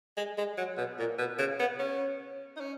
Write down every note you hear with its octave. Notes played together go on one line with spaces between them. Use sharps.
G#3
G#3
F#3
B2
A#2
B2
C#3
B3
C#4
D#4
C#4